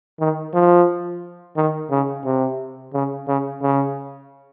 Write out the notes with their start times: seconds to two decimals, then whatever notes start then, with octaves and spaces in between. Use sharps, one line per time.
0.20 D#3
0.54 F3
1.57 D#3
1.91 C#3
2.25 C3
2.94 C#3
3.28 C#3
3.62 C#3